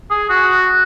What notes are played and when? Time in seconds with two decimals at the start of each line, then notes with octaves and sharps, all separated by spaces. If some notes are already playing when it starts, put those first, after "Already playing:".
0.10 G#4
0.30 F#4